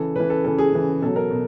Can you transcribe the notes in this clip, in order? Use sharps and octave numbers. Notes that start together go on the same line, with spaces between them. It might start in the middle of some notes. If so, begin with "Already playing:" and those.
Already playing: C#3 E3 A4
C#3 E3 B4
A4
C#3 E3 A4
G#4
C#3 E3
B2 F#3 A4
A#4
B2